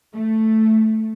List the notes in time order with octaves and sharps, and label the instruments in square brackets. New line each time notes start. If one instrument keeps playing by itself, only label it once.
[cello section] A3